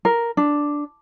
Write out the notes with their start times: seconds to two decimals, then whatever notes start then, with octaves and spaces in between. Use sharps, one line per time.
0.05 A#4
0.37 D4